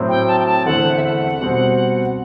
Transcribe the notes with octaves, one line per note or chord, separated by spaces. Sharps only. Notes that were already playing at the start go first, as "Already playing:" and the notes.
Already playing: A2 F#3 C4
G5
A5
G5
A5
E2 D3 A3 C4 E4 F#5
E5
F#5
B2 G3 C4